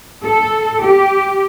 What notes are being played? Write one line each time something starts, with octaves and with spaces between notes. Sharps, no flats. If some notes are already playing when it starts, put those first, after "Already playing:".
A4
G4